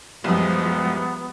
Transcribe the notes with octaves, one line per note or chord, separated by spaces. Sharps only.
C2 F#2 F3 G#3 B3